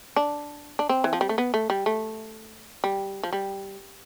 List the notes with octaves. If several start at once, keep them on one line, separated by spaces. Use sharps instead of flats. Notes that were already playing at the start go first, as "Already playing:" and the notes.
D4
D4
C4
E3
F3
G3
A3
B3
A3
G3
A3
G3
F3
G3